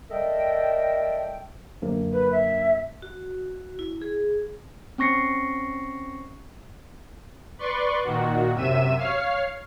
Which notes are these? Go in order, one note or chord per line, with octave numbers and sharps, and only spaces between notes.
G3 A4 A#4 D#5 E5 G5
F#2 D3 A#3
B4
E5
F#4
E4
G#4
C4 C#4 C#6 A#6 C7 C#7
B4 D5 C6 C#6
A#2 D#3 F#4
F#2 C3 E5 D#7 E7
C#5 F5 F6 C7